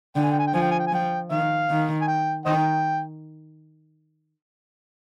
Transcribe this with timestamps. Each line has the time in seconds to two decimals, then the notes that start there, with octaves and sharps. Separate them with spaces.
0.16 D3 G5
0.23 G#5
0.32 G5
0.39 G#5
0.47 G5
0.54 F3 G#5
0.62 G5
0.72 G#5
0.79 G5
0.87 G#5
0.92 F3 G5
1.31 D#3 F5
1.70 D#3
2.02 G#5
2.08 G5
2.46 D#3 C5 D#5 G5